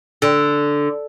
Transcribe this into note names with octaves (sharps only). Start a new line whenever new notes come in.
D3